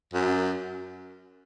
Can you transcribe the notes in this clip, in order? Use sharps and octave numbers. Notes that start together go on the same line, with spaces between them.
F#2